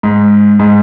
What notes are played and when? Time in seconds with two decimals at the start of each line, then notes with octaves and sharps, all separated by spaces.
0.03 G#2
0.59 G#2